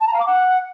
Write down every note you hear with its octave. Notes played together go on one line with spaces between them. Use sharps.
A5
A#5
F5
D6
F#5